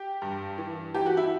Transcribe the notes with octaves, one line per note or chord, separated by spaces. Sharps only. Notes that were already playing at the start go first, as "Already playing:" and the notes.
Already playing: G4
G2
E3
E3 G4
F#4
E4